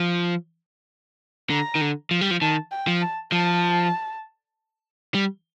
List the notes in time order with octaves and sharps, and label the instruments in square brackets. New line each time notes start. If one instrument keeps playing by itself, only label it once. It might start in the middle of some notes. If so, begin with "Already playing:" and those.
Already playing: [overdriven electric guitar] F3
[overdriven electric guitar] D3 [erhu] A#5
[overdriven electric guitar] D#3
D3
F3
G3
F3
[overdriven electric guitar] D#3 [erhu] A5
[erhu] G5
[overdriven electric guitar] F3
[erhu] A5
[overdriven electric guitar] F3 [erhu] A5
[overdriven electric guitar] G3